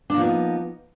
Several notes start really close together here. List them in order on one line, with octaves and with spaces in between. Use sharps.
D4 A#3 F3 B3 D#4